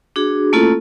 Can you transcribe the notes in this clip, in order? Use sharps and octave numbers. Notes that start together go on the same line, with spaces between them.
D4 F#4 G#4
A3 A#3 C#4 E4 F4 A4